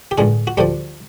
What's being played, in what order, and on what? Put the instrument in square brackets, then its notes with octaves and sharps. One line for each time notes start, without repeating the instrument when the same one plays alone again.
[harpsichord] G4
A1 G2 D3 G#3 G#4
F#4
D2 D3 F3 G3 G4